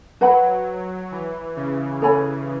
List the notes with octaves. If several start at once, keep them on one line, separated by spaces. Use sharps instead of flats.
F#3 B4 F#5 B5
E3
C#3
A4 C#5 G#5 B5